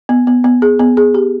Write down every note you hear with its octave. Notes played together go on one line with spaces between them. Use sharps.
B3
B3
B3
G#4
B3
G#4
G4